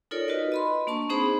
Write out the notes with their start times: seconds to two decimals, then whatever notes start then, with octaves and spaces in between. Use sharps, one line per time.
0.11 D#4 F4 A4 A#4 C#5 D5
0.28 F#4 B4 D#5
0.52 D#5 B5 C6
0.87 A#3 D4 A5 C#6
1.09 C4 D#4 G#4 C5 B5